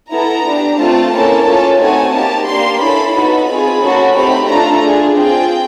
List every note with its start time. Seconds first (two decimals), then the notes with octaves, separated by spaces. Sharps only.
0.11 B3 E4 A4 A#5
0.45 D4 G4
0.78 A3 C4 F4 A5
1.12 A#3 C#4 E4 A4
1.46 C#4 F4 A4
1.79 A3 C4 D#4 F#4 G#5
2.12 A#3 D#4 G4 A5
2.47 A#3 D4 G4 C6
2.80 C#4 E4 A4 B5
3.14 B3 D#4 F#4 A4 B5
3.48 C4 F4 G#4
3.81 A#3 C#4 F#4 A4
4.14 A3 C4 D#4 G4 B5
4.48 A3 D4 F4 A4 A#5
4.82 D4 F4 G#4
5.16 C4 F4 G#4 G5